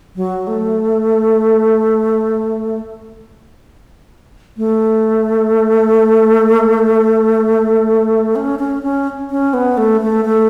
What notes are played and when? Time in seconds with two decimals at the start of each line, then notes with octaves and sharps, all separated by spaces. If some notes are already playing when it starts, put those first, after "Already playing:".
0.16 F#3
0.47 A3
4.57 A3
8.36 C#4
8.59 C#4
8.83 C#4
9.30 C#4
9.54 B3
9.77 A3
10.01 A3
10.25 A3